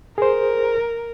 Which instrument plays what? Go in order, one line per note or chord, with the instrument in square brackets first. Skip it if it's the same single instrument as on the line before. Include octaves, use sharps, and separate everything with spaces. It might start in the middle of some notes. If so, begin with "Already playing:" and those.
[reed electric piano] G#4 C5 [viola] A#4